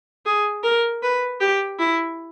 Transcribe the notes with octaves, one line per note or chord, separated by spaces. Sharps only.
G#4
A#4
B4
G4
E4